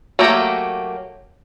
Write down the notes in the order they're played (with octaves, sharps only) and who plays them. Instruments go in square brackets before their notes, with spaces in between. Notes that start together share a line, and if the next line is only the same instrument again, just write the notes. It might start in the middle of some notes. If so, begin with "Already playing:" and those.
[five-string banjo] F#3 A3 A#3 G4 A#5